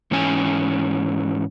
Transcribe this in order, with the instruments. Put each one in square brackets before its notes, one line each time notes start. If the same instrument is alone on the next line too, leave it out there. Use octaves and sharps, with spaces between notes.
[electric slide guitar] G#2 E3 C#4 G#5